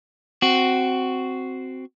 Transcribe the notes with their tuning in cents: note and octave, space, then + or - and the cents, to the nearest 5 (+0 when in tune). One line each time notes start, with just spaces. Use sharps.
C4 -5 F#4 +5